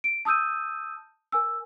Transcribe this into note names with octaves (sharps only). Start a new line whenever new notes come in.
D7
A5 D#6 E6 G6 D#7
A#4 G#5 E6